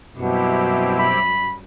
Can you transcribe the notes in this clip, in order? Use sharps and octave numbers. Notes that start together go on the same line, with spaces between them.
F#2 B2 G3 C4 E4 G4
B5